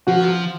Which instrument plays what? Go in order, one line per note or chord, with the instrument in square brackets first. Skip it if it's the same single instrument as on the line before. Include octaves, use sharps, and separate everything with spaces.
[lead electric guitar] F3 [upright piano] F#4